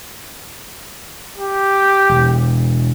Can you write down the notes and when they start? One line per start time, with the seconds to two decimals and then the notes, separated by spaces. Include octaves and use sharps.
1.38 G4
2.09 E1